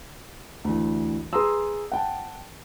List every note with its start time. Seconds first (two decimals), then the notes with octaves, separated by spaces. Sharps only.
0.65 D2 E3
1.33 G#4 B4 A#5 C6 D#6 E6
1.92 F#5 G5 A5